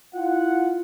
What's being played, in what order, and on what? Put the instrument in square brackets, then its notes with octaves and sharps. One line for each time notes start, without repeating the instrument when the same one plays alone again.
[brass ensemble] E4 F4 F#5